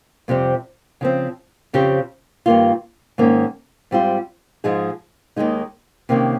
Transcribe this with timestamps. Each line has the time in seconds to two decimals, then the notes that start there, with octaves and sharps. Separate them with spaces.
0.28 F2 C3 G3 C4
1.01 C#3 F3 C4
1.73 F2 C#3 F3 C4 G4
2.46 G2 D#3 A#3 F4
3.18 G#2 D#3 A#3 C#4
3.91 G#2 G3 C4 F4
4.64 G#2 F3 G#3 D#4 G#4
5.36 D#2 D#3 G#3 D#4
6.09 C3 D#3 A#3 C#4